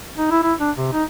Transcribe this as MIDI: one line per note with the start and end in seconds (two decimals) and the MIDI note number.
0.18 0.30 63
0.31 0.39 64
0.43 0.54 64
0.60 0.71 62
0.77 0.89 48
0.93 1.04 63